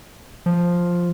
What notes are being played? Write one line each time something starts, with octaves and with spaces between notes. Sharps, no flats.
F3